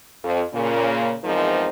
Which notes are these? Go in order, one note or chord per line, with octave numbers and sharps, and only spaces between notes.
F2
A#2 C#3 A#3
E2 G#2 F3 C4 D#4 A#4